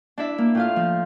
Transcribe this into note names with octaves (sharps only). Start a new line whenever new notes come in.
D4 E4 E5
A#3
A2 F4 F5
F3